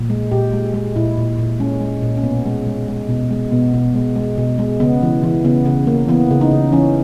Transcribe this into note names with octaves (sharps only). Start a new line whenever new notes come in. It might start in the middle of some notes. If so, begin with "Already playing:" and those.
Already playing: A#2
G#3
A#2 G4
G#3
G#3
A#2 E4
A#2
A#2
G#3 C#4
G#3
A#2
C#4
B2 B3
G#3
G#3
G#3
B2
G#3
B2 B3
B2
G#3
G#3
B2
G#3
C#3 B3
E3
E3
C#3 B3
C#3
A#3
E3 B3
C#3
D#4
C#3
E3 C#4